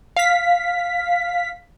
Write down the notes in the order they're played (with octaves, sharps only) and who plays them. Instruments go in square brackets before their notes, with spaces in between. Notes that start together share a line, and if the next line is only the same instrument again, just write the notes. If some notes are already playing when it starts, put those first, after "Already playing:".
[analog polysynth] F5 B6